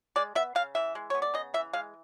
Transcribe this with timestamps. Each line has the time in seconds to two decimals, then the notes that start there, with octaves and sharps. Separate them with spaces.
0.16 G#3 D5
0.35 B3 E5
0.55 C#3 F5
0.75 E3 E5
0.95 G#3
1.10 B3 C#5
1.22 D5
1.34 C#3 D#5
1.54 E3 E5
1.73 G#3 F5